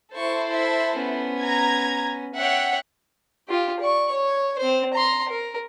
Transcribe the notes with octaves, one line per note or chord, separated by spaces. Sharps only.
E4 A4 C5 C#6
E5
B3 C#4
A#5 G#6
C#5 E5 F#5 G5
F4 G4
D5 C#6
C#5
C4 C5
A#5 C6
A#4